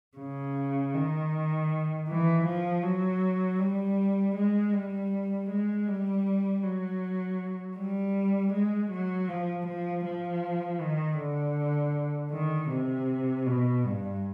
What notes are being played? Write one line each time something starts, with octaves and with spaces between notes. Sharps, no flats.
C#3
D#3
E3
F3
F#3
G3
G#3
G3
G#3
G3
F#3
G3
G#3
F#3
F3
F3
F3
D#3
D3
D#3
C3
B2
G2